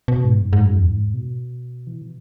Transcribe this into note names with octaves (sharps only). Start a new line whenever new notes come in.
B2
G#2
F#2
G#2
F#2
E2
G#2
B2
E3
B2